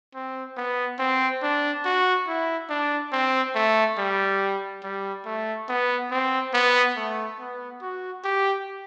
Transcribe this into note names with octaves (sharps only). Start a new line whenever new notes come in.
C4
B3
C4
D4
F#4
E4
D4
C4
A3
G3
G3
A3
B3
C4
B3
A3
B3
F#4
G4